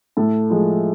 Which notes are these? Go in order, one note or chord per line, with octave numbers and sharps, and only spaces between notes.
A2 A4
F3 G#3